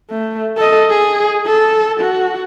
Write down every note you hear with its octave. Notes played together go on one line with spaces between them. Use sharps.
A3
A4 D#5
G#4
A4
F#4